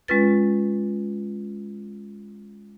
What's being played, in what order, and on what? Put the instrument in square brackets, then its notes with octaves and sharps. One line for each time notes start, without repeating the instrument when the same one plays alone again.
[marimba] G#3 C#4 F4 B4 A6